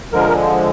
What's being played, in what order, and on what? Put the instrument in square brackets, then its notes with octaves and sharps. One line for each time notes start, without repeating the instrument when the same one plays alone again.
[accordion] D3 F3 G#3 A#4